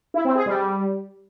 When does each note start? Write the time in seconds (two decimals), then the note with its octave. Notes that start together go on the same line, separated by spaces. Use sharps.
0.14 E4
0.25 C4
0.35 G#4
0.46 G3